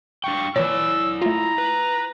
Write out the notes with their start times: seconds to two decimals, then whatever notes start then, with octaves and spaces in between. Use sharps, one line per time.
0.24 D4 F5 G5 C#6
0.56 A#2 E3 E4 C#5 D5 E6
1.22 A3 F4 A#5
1.58 B4